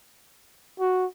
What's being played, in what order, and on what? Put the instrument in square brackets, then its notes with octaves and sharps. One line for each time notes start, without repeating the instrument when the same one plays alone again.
[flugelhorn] F#4